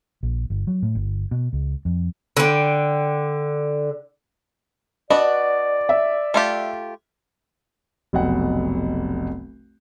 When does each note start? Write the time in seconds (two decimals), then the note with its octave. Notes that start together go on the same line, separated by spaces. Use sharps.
0.23 A#1
0.50 G1
0.67 F#3
0.82 A2
0.95 G1
1.31 B2
1.53 C#2
1.85 F2
2.37 D3 G5
5.10 D4 F#4 B4 D5 D#5
5.89 E5
6.34 A3 F4 G4
8.13 F1 B1 F#5